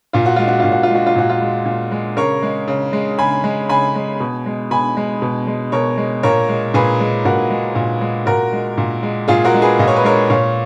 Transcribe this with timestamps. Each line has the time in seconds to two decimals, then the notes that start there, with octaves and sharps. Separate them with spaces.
0.13 A#2 F4
0.26 F#4
0.36 G#3 F4
0.48 F#4
0.60 A#2 F4
0.72 F#4
0.83 F4
0.90 G#3 F#4
1.07 F4
1.15 A#2 F#4
1.30 F4
1.41 G#3
1.66 A#2
1.91 G#3
2.17 C#3 A#4 C#5
2.42 G#3
2.68 C#3
2.93 G#3
3.18 C#3 G#5 B5
3.44 G#3
3.69 C#3 G#5 B5
3.95 G#3
4.20 B2
4.46 G#3
4.71 B2 G#5 B5
4.97 G#3
5.22 B2
5.47 G#3
5.72 B2 A#4 C#5
5.98 G#3
6.23 A#2 A#4 C#5
6.49 G#3
6.74 A#2 G#4 B4
7.00 G#3
7.25 A#2 F#4 A#4
7.51 G#3
7.75 A#2
8.01 G#3
8.26 A#2 F#4 A#4
8.53 G#3
8.78 A#2
9.03 G#3
9.28 A#2 F4 G#4
9.45 F#4 A#4
9.54 G#3
9.62 G#4 B4
9.79 A#2 D#5
9.87 C#5
9.96 B4
10.04 G#3 A#4 C#5
10.30 A#2 C#5 F5